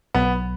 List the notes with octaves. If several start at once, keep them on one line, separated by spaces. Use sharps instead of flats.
B1 B3